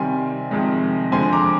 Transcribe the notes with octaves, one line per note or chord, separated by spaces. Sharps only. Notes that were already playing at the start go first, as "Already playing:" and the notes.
Already playing: C3 D#3 G3 C4 G#5 C6
F2 C3 D#3 G#3
F2 D3 G#3 C4 G#5 C6
A#5 D6